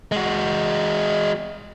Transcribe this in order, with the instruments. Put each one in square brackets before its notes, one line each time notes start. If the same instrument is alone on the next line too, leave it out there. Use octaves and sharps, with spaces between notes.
[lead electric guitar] G#3 F#4